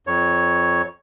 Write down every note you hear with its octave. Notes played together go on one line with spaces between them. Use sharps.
F2 C#5